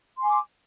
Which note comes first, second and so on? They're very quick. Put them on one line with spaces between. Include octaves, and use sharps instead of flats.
C6 G#5 D6